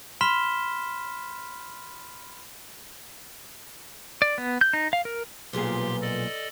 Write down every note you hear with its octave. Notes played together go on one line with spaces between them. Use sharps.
B5 C6 F6 B6 E7 G7
D5
B3
G6
D#4
F5
A#4
B1 A#2 F3 B3 G4 G#4 C6
A4 D5 D#5